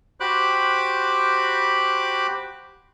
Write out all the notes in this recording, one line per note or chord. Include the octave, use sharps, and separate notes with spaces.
F#4 G4 C5 B5 D6 F#6